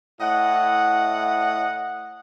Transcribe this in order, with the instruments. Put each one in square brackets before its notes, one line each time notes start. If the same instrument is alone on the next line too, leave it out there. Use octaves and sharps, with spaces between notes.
[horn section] A2 E4 D#5 F#5